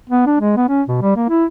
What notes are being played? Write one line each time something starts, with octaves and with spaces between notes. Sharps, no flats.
B3
D4
G#3
B3
C#4
B2
G3
A#3
E4